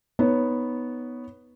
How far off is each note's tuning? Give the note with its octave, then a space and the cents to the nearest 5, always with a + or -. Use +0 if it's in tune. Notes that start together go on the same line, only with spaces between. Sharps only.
B3 +0 D#4 +10 C#5 +0